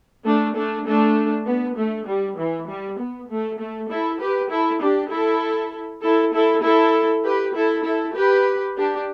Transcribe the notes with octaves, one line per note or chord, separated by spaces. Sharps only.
A3 D4
A3 D4
A3 D4
B3
A3
G3
E3
G3
B3
A3
A3
E4 A4
G4 B4
E4 A4
D4 G4
E4 A4
E4 A4
E4 A4
E4 A4
G4 B4
E4 A4
E4 A4
G4 B4
D4 G4